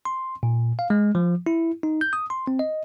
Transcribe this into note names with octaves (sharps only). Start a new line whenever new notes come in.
C6
A#2
F5
G#3
F3
E4
D#4
G6
D#6
C6
C4
D#5